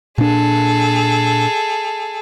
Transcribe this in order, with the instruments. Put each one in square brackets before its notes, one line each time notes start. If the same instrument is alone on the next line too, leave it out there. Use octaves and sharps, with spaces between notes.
[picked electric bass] A#2 D4 [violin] G#4 A4